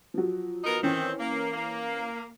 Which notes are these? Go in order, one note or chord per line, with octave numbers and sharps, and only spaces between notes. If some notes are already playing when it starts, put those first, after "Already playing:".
F3 F#3
B3 D#4 A#4
D#3 E3 C4 C#4
A#3
A#3